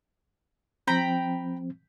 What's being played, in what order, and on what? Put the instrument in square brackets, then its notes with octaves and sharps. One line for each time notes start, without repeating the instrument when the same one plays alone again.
[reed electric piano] F3 C4 [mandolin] G5 A#5 B5